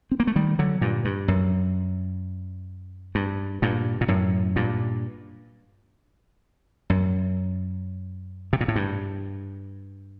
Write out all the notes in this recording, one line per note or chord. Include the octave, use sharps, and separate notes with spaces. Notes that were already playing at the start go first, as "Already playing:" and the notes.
C4
A#3
A3
D#3 G3
D3 F#3
G2 A#2
G2
F#2
G2
G2 A#2
A#2
F#2 A2
G2 A#2
F#2
C3
A#2
A2
G2